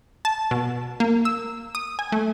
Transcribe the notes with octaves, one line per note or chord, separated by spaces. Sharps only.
A5
B2
A#3
E6
D#6
G#5
A3